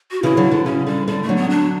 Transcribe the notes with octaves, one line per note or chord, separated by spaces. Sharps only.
F#4
C#3 E3 E4
D3 F#3
D3
C#3 C#4
D3 G3
D3 G3
A3
D3 F#3
B3
D4